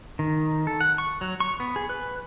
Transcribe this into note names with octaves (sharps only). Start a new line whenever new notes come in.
D#3
A4
F#5
C#6
F#3
C#6
B3
G#4
B4